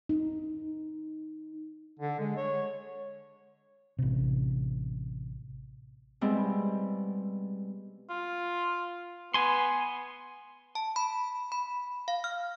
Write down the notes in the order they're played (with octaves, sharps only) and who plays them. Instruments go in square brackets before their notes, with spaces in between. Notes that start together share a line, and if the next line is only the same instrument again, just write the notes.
[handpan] D#4
[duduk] D3
G#3
C#5
[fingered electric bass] A1 C3
[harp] B2 G3 G#3 C4 E4
[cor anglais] F4
[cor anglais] B3 [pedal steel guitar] G#5 C6
[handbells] A5
B5
B5
F5
F6